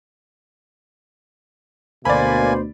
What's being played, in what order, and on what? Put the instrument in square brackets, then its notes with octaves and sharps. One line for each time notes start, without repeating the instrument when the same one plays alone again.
[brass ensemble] D2 B2 [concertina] A#3 G#5 [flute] C5 [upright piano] D5 B5